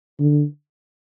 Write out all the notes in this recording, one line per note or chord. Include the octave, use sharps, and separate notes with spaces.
D3